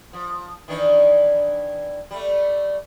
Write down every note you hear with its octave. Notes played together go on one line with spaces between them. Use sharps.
F3
D#3 E3 D4
G3 A3